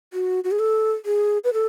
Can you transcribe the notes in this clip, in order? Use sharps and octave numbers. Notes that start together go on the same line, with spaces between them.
F#4
F#4
G#4
A4
G#4
B4
A4